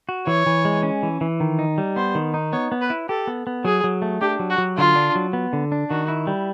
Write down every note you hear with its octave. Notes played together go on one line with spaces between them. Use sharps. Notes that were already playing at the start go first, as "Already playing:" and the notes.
F#4
E3 C#5
E3
G#3
C#4
E3
E3
D#3
D#4
G3
B3 C5
D#3
D#4
B3 C#5
B3
B4
E4
G4 A4
B3
B3
F#3 G#4
F#3
A3
D4 G4
F#3
F#4
F#3
D3 F4
D4
F#3
B3
D3
D4
D#3 F#4
E4
G3